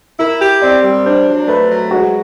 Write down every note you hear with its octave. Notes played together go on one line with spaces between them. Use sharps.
E4 A#4
G4
C4 D5
G3
D4 C5
F#3
A3 B4
F#3
G#3 F#4